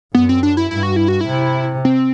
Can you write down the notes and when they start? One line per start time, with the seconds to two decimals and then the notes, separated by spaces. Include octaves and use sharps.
0.14 F#2 B3
0.29 C4
0.43 D4
0.57 E4
0.71 G2 E4
0.83 F#4
0.96 E4
1.08 F#4
1.21 E4
1.27 C3
1.85 C4